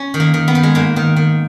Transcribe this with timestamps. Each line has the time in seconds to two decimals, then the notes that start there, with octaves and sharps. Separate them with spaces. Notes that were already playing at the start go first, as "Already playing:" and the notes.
Already playing: C#4
0.14 D#3
0.20 A#3
0.34 D#3
0.48 B3
0.55 D#3
0.63 G#3
0.75 G#2 A#3
0.96 D#3
1.16 D#3